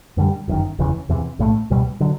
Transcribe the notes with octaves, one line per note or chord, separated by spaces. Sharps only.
F#2 D3 G3
G1 F#2 D#3
F1 E2 C#3 E3
E2 C3 E3
B1 A2 F#3 A3
C#2 B2 G3
D3 F#3